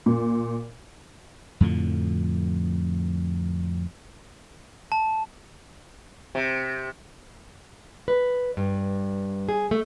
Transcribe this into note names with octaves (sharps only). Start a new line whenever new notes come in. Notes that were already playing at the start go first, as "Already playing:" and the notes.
A#2
F2 A2 D3 F3
A5
C3
B4
G2
G#4
A3